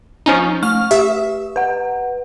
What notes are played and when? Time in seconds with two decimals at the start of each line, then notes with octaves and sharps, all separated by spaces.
0.26 F3 C#4 D#4
0.63 A3 C#6 F6
0.91 G4 E5
1.56 B4 F#5